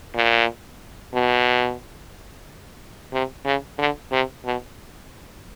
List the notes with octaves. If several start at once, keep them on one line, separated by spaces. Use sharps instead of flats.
A#2
B2
C3
C#3
D3
C3
B2